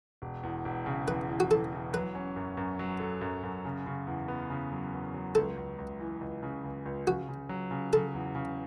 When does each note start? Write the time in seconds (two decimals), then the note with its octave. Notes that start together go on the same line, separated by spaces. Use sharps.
0.22 E1
0.43 E2
0.65 E1
0.86 C#3
1.08 E2 B4
1.30 E3
1.40 F#4
1.51 E3 A4
1.73 E3
1.93 F#3 B4
2.15 C#4
2.36 F#2
2.57 F#2
2.79 F#3
3.00 A4
3.21 F#2
3.43 F#2
3.65 C#3
3.86 C#3
4.07 E2
4.28 B3
4.50 C#3
4.72 F#3
4.93 E2
5.14 F#3
5.35 C#2 A4
5.57 C#2
5.78 C#2
6.00 E3
6.21 C#2
6.43 C#3
6.64 C#2
6.86 C#2
7.07 C#3 F#4
7.29 C#3
7.49 F#3
7.71 C#3
7.93 C#3 A4
8.14 E2
8.35 C#3